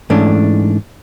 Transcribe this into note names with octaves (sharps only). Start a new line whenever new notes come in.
G#2 E3 A3 C#4 D4